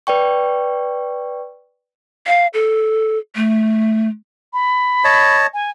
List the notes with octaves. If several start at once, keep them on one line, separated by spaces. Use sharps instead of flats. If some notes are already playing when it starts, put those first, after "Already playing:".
B4 D5 G5 C#6
F5
A4
A3
B5
C#5 D#5 A5
G#5